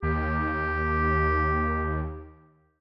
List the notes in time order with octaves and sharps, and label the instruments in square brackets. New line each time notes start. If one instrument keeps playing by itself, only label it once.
[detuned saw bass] D#2 [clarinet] G4